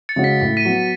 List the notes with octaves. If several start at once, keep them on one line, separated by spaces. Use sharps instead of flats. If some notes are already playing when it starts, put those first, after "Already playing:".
A6 C#7
C#3 G#3 C#4 F#4
B6
A2 B6
B6 D#7
F#3 B3